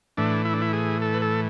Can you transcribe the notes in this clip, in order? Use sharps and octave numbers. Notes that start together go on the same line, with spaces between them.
A2 E3 D4
E4
D4
E4
G#4
A4
B4
A4